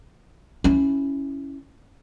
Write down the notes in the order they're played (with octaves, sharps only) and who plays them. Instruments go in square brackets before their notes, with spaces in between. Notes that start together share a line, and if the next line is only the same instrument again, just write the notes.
[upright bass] C#4 E4